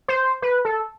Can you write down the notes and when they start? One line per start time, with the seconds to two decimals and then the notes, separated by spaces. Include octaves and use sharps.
0.08 C5
0.42 B4
0.65 A4